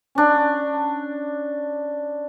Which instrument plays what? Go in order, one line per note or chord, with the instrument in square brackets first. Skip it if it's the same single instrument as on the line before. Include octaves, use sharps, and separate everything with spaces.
[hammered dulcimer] C#4 D4